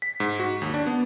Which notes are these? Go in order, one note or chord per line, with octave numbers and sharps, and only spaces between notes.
B6
G#2
F#4
D#2
D4
B3